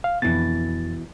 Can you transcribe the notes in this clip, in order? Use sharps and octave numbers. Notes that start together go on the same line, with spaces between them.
F5
F2 B2 E3 A6